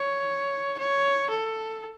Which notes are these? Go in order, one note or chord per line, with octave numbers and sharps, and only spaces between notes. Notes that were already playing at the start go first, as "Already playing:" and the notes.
Already playing: C#5
C#5
A4